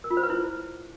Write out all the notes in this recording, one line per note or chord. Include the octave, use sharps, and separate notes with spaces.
A#4
F4
C5
B4
E4